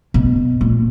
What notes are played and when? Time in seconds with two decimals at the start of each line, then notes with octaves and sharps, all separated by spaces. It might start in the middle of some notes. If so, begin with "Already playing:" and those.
0.14 B2
0.61 A#2